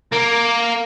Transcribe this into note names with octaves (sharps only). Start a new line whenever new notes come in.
A#3 A#4